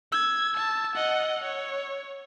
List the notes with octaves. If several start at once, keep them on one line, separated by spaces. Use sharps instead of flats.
E6 G#6
A5
D#5 F#5
C#5